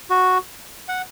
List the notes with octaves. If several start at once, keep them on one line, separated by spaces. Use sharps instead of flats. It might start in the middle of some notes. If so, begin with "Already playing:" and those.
F#4
F#5